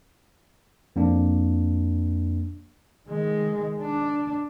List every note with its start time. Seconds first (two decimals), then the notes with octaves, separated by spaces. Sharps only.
0.96 F2 A#3 D4
3.08 D#3 G#3
3.82 D4